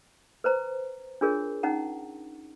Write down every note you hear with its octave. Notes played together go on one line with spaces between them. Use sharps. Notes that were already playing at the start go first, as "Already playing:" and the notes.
B4 C5 A#5
D4 F4 G#4 A#4 C#5
C#4 D#4 F#5 A#5